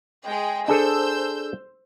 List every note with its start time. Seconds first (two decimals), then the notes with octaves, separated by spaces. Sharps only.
0.27 G#3 G#4 G5
0.68 D4 G#4 A4 C5 E6 G6